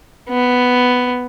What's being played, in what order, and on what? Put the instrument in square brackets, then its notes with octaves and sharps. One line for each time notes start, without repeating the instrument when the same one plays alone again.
[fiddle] B3